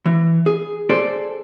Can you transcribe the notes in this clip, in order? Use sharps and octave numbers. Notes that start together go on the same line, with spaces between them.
E3
G#4
G#4 A4 C5 D5